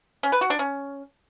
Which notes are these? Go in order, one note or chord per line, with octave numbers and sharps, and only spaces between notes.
C#4
B4
F#4
D4
C#4